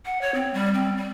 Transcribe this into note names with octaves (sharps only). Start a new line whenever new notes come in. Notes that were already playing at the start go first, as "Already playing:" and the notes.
F#5
C#5
C4
G3
C4
G3